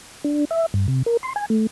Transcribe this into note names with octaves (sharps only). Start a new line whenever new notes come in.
D4
E5
G2
C3
A#4
C6
G#5
A3